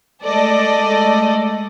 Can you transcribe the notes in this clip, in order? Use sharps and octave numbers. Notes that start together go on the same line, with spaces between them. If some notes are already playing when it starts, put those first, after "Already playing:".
G#3 A3 A4 D5 D#5